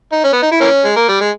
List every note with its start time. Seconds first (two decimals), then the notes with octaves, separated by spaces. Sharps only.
0.12 D#4
0.24 C#4
0.33 B3
0.42 D#4
0.52 E4
0.60 E3 A#3 C#4
0.85 G#3
0.96 A#3
1.08 G3
1.21 G#3